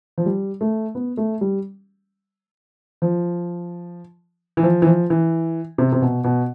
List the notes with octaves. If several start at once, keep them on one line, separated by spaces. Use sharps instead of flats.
F3
G3
A3
B3
A3
G3
F3
E3
F3
E3
F3
E3
C3
C3
B2
B2